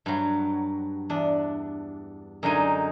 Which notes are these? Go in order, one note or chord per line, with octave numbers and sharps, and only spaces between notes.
G2 F#3
E2 D4
F#2 D3 G#3 D#4 G#5